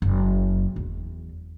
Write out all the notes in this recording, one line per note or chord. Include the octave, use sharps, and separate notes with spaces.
F#1
E2